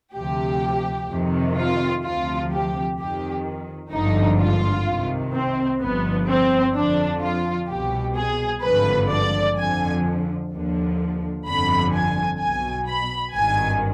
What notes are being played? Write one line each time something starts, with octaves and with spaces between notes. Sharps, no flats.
D2 C3 F3 G4
F2 C3 D#3
F4
D2 C3 F3 F4
G4
F2 D#3 G4
G#1 G2 D3 F3 D#4
F4
C2 C3 D#3
C4
G1 G2 F3 B3
C4
F2 D3 F3 D4
F4
C2 B2 G4
G#4
G#1 G2 D3 F3 B4
D5
F2 D3 F3 G#5
D#2 D3 F3
G1 F2 D3 F3 B5
G#5
B1 B2 G#5
B5
G#1 G2 D#3 G#5